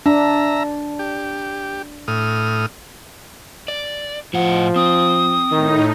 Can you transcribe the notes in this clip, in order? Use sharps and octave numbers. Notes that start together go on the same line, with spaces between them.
D4 E5 A#5
G4
A2 D#6 F6
D5
A2 F3 F#5
C4 D#6
A2 D#3 D#4